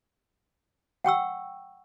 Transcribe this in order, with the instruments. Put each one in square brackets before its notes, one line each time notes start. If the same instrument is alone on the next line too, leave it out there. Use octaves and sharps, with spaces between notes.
[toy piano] F#5 G5 C#6 E6